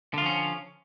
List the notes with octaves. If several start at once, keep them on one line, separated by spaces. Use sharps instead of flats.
D3 F3 C#4 F4